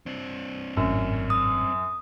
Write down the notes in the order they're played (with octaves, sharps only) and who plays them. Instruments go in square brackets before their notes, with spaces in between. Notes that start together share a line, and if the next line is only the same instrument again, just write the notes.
[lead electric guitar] C4 D4
[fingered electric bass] G#1 A2 [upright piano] F#2
[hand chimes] D#6